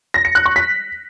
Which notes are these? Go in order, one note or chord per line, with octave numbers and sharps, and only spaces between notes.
A#6
C#7
F#6
C#6
B6